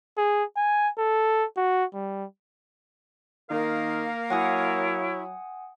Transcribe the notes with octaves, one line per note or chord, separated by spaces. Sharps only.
G#4
G#5
A4
F#4
G3
D#3 A#3 A#4 F5
F#3 E4 C#5 F#5 G#5 C#6 D#6